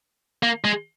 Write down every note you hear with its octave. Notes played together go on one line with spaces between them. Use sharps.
A#3
G#3